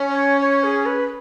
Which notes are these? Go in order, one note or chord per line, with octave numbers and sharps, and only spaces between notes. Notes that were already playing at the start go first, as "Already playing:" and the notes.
Already playing: C#4
C#5
C#5
G#4
B4